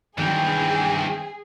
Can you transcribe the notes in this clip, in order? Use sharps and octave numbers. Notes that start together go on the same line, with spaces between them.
G2 D#3 E3 F#3 C4 G#4 G5